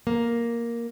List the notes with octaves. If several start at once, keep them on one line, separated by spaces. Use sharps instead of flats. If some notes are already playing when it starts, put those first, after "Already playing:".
A#3